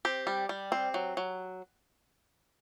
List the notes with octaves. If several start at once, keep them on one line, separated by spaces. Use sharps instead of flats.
C4 G4
G3
G3
C4
F#3
F#3